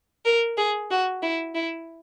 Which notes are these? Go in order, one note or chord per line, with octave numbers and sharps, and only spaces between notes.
A#4
G#4
F#4
E4
E4